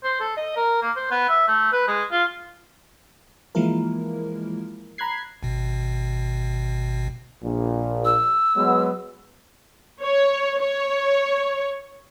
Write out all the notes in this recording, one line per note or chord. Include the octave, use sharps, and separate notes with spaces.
C5
A4
D#5
A#4
A#3
C5
B3
E5
A3
B4
G#3
F4
E3 F3 G#3 A#3 E4 A#4
A#5 B5 F#6 G#6 C7
G#1 B2
A#1 A#2
E6
F#3 G#3 B3
C#5
C#5